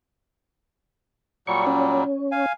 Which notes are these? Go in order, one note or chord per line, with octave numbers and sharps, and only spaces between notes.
A#2 F#3 G3 C#6
C#4
F5 G#5